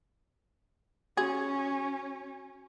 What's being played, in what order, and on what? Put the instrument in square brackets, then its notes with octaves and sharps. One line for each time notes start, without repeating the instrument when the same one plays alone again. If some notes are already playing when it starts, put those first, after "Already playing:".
[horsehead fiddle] C#4 [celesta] F#4 [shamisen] G#4